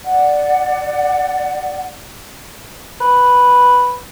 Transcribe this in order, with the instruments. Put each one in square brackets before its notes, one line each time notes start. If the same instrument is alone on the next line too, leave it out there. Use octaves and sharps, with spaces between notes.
[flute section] D5 F#5
[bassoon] B4